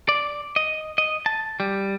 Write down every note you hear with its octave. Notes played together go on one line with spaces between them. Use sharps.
D5
D#5
D#5
A5
G3